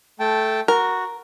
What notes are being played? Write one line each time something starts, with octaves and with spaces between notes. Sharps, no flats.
A3 G5 A5
F#4 A#4